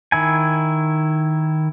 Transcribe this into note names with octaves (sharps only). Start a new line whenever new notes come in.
D#3 E4 G#5